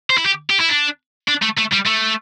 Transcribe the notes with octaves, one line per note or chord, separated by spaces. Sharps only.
C5
E4
G4
G4
E4
D4
D4
A3
A3
G3
A3